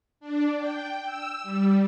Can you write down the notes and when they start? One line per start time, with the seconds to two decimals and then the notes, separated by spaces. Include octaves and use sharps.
0.20 D4
0.57 G5
1.05 E6
1.43 G3